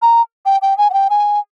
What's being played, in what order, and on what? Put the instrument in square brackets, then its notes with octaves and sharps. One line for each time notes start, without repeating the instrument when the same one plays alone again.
[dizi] A#5
G5
G5
G#5
F#5
G5
G#5